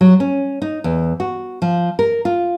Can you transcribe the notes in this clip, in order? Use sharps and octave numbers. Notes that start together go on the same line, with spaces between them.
F#3
C#4
D#4
E2
F#4
F3
A#4
F4